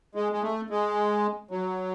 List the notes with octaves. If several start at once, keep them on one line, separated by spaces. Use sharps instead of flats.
G#3
G#3
A3
G#3
F#3